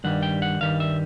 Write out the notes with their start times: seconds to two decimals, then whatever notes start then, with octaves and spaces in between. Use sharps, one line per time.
0.04 G2 D#3 G3 F#5
0.23 G5
0.42 F#5
0.60 G2 D#3 G3 F5
0.80 E5